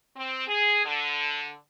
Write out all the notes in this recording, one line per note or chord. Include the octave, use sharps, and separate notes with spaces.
C4
G#4
D3